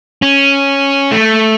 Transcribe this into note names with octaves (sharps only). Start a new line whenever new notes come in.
C#4
A3